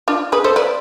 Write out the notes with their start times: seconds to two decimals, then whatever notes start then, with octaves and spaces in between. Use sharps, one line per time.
0.08 D4 F4
0.32 G#4 B4
0.44 A4 C5
0.56 B4 D5